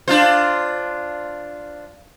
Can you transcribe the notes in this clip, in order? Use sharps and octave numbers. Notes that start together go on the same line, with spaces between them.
D4 F4 C5